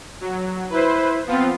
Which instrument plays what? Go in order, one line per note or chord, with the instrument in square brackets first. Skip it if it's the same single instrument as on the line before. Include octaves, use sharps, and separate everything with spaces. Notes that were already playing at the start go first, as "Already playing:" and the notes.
[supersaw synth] F#3
[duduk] E4 [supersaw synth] B4 C5
[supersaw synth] F3 B3 F4 [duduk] C4